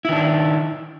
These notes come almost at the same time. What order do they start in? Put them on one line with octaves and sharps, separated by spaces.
E4 D#3 D4